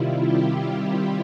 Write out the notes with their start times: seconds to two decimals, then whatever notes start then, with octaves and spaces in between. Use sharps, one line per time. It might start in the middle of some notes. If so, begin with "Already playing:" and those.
Already playing: C3 D#3 G3 E4 F4
0.23 G4